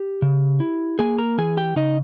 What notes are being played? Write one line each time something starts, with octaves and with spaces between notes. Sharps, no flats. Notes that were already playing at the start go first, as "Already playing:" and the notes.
Already playing: G4
C#3
E4
A#3 G#4 G#5
A#4 A#5
E3 G#4 G#5
G4 G5
C#3 D#4 D#5